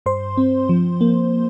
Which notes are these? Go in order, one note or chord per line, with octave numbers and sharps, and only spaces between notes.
G2 C5 C6
C4
F3
A#3